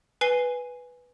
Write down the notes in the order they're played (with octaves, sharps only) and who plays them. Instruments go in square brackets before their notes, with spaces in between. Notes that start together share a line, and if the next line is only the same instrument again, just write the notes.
[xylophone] B4 G#5 C7 D#7 G7